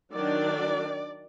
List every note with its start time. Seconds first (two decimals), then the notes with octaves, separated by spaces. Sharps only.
0.14 D#3 F#3 D4 D5